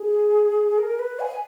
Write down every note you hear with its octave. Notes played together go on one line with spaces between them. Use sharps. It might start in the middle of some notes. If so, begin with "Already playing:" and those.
Already playing: G#4
A#4
B4
G#5